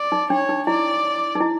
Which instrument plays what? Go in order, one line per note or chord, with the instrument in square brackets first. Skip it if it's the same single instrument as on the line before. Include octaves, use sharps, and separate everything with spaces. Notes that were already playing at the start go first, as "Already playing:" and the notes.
Already playing: [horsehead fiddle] D5
[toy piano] D#4
[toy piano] D4 [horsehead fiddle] C#5
[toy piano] D#4
[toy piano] E4 [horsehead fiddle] D5
[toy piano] D#4
E4